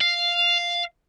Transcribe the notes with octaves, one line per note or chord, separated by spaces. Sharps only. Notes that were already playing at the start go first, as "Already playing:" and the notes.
F5